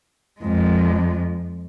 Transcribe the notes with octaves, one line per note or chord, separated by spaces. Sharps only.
F2 G#3